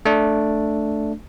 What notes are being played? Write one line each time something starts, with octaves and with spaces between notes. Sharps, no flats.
A3 D4